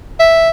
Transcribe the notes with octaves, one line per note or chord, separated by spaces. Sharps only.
E5